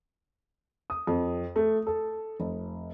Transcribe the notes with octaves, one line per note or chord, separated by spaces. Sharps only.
D#6
F2
A3
A4
F1